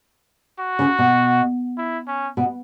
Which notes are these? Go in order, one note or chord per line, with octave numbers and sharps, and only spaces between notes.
F#4
C#3
B2
E4
C#4
B2